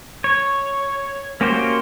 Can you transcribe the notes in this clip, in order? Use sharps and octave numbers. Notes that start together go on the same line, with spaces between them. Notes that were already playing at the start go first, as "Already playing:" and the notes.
C#5
A#3 C#4 F#4 G4 C5